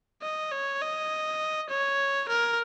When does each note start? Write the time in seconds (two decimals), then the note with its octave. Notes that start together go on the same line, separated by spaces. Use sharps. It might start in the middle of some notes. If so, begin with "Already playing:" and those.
0.22 D#5
0.52 C#5
0.81 D#5
1.70 C#5
2.29 A#4